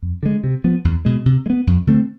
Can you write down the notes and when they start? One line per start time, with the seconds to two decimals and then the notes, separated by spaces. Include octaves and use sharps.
0.02 F2
0.23 D3 G#3
0.44 C3
0.64 F3 B3
0.85 E2
1.05 B2 G#3
1.26 C3
1.46 G#3
1.50 B3
1.67 F2
1.87 D3 A3 C4